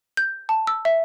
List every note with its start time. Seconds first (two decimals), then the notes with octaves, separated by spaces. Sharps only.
0.17 G6
0.49 A5
0.67 E6
0.85 E5